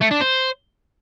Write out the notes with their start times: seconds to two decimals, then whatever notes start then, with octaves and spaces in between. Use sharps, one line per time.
0.01 A3
0.11 D4
0.21 C5